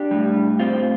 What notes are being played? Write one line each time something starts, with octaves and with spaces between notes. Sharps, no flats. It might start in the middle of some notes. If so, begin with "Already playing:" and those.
Already playing: D4 G4
A2 G3
C4 F4